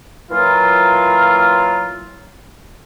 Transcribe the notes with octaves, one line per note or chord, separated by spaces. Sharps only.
A#2 E3 F#3 F4